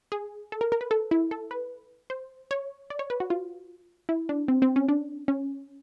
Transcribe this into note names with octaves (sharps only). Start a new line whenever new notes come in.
G#4
A4
A#4
A#4
B4
A4
E4
A4
B4
C5
C#5
D5
C#5
B4
F#4
F4
E4
D4
C4
C4
C#4
D4
C#4